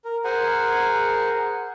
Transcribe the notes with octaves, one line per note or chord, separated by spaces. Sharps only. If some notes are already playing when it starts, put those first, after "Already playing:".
A#4
G#4 A#4 C5 F#5 G#5